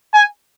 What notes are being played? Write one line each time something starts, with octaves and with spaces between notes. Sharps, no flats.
G#5